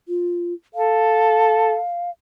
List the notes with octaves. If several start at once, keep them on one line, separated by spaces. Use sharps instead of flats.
F4
A4 F5